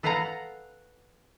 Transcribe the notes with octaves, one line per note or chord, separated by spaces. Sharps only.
A4 B4 F5 F#5 G#5 A#5